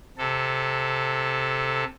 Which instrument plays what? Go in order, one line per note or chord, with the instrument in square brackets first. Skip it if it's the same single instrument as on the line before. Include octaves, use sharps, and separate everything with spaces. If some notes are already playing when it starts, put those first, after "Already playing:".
[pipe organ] C3 A4